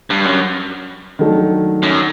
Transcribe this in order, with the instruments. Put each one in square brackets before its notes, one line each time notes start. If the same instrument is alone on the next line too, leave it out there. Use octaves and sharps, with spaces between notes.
[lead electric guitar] G2
F#2
[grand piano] D#3 F#3 A3 D4
[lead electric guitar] F#2